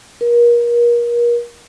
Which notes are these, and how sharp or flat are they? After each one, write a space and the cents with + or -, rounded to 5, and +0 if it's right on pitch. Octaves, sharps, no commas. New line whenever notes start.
A#4 +35